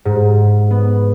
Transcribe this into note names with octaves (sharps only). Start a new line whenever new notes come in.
G#2
B3